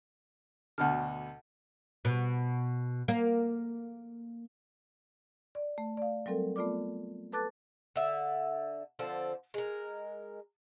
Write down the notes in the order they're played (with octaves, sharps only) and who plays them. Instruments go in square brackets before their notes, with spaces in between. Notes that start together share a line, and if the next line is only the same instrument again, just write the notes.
[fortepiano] D2 B2 D3 [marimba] F#5 A5 F6
[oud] B2
A#3
[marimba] D5
A3
D5 F5
F#3 G3 C4 A4 A#4
A3 B3 F4 D5 D6
A4 B4 A5 D6 F#6 A6
[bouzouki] D3 E5
D3 F3 C4 A4
G#3 A#4